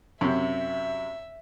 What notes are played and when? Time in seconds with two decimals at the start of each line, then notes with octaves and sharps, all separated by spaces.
0.21 F#2 C3 E5